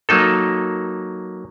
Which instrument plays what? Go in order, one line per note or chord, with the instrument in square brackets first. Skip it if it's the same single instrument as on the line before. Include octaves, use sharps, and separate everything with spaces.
[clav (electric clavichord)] F#3 A#3 D#4 A4